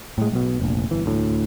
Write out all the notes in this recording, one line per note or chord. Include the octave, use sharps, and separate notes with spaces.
A2 G#3
B1 B2
F1 A#1
G1 E3
D2 A2